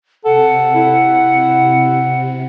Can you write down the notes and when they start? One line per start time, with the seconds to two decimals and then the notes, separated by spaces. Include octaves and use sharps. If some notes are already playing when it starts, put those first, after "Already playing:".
0.25 C3 A4 F#5
0.75 E4